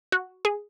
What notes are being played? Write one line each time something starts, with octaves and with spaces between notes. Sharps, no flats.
F#4
G#4